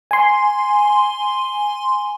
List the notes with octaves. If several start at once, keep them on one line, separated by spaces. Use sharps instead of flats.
G#5 C6